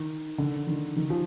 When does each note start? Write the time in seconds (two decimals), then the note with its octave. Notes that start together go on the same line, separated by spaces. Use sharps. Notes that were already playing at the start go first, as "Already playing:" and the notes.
Already playing: D#3
0.38 D3
0.67 D#3
0.96 D#3
1.10 F3